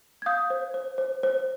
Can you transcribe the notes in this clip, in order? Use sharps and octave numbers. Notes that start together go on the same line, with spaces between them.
G#6
F5 D#6 G6
C5
C5
C5
C5